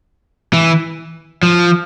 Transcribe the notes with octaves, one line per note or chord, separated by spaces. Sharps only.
E3
F3